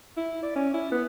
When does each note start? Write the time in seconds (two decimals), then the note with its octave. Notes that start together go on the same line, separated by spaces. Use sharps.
0.17 E4
0.42 D5
0.56 C#4
0.74 E4
0.92 B3